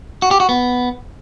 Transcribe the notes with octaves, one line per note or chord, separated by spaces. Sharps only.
F#4
G4
F#4
B3